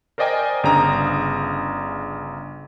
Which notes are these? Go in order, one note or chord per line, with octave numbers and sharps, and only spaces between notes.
A#4 C5 D5 D#5 G5 G#5
G1 C#3 D4 A#5 D#6